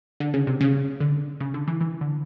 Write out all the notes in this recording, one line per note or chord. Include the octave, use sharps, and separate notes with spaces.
D3
C#3
C3
C#3
D3
C#3
D3
E3
E3
D3